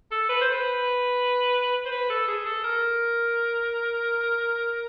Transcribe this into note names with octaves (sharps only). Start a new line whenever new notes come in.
A4
B4
C5
B4
C5
B4
A4
G#4
A4
A#4